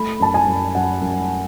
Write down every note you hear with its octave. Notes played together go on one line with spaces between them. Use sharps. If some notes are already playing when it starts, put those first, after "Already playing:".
Already playing: A3 B5
F#2 A5
G#5
F#2
F#2 F#5
F#2